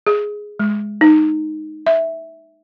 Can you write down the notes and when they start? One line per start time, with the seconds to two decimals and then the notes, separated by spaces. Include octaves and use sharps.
0.07 G#4
0.59 G#3
1.01 D#4
1.87 E5